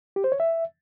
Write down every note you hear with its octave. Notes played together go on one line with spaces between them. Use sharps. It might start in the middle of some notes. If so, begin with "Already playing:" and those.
G4
C5
C#5
E5